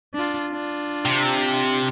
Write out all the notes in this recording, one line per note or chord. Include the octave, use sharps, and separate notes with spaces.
D4 F4
D4 F4
C3